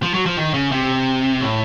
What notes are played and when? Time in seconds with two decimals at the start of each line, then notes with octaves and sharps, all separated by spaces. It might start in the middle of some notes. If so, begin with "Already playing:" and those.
0.03 F3
0.14 F#3
0.26 F3
0.37 D#3
0.54 C#3
0.72 C3
1.40 A2